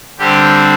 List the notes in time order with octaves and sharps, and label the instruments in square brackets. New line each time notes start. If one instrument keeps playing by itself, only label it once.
[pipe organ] D3 G3 C4 G4